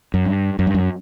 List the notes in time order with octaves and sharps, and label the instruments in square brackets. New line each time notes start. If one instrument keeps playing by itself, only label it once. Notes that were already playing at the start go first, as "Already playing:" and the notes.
[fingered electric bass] F#2
G2
F#2
G2
F#2